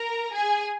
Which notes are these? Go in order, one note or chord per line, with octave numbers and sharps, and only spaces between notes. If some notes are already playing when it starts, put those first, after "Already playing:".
Already playing: A#4 A#5
G#4 G#5